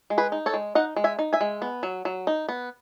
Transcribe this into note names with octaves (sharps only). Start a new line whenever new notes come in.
G#3
G#4 B4
D#4
A4 C#5
G#3
D#4 D#5 F#5
G#3
E5 G#5
D#4
E5 G#5
G#3
B3
F#3
F#3
D#4
B3